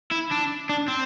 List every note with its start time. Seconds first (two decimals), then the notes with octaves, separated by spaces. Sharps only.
0.11 E4
0.31 D4
0.69 D4
0.88 C4